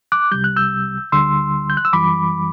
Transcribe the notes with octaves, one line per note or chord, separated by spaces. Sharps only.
D6 F#6
C2 C3 G3 G6
F#6
E6 G6
D2 D3 G3 C6 E6
G6
F#6
E6
F#2 E3 G3 B5 D6